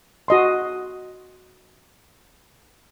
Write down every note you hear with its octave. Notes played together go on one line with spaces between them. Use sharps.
F#4 D#5 C6